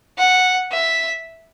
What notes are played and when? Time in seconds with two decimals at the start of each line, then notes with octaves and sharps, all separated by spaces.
0.18 F#5
0.72 E5